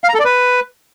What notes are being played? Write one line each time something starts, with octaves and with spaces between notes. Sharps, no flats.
F5
A#5
A4
D5
B4